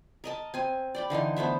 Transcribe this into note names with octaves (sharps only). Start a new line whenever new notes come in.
A#4 D#5 A5
C4 G#5
D5 G5 B5
D3 E3 D#4 C6
A3 B3 C5 E5